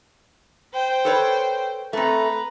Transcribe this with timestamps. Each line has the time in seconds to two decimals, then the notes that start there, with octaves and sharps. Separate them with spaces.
0.73 C5 G5
1.05 A4 B4 C#5
1.93 A3 C4 B4 A#5